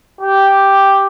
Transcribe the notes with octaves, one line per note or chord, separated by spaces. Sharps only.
G4